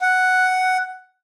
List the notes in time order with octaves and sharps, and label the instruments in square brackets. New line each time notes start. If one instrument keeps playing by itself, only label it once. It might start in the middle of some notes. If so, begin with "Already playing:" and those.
[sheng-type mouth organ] F#5